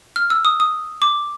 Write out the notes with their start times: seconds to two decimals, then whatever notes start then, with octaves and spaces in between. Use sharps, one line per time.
0.16 F6
0.30 E6
0.45 D#6
0.60 D#6
1.02 D6